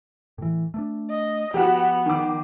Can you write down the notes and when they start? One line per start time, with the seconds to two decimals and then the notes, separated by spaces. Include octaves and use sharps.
0.38 A2 E3
0.74 A3 A#3 D4
1.10 D#5
1.54 F3 B3 F#4 G4
2.06 D#3 D6